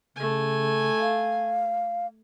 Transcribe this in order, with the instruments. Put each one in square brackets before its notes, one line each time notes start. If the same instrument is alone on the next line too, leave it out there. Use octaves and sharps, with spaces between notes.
[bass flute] C#3 [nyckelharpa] A3 G#5
[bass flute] F5